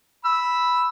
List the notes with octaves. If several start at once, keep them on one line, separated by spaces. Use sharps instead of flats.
B5 E6